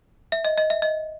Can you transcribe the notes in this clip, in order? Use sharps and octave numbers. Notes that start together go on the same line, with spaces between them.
E5
D#5
D#5
E5
D#5